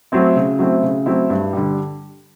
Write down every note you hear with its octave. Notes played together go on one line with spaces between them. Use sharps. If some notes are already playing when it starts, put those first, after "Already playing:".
F#3 A3 C4 E4
C#3
F#3 A3 C4 E4
C#3
F#3 A3 C4 E4
G2
D3 G3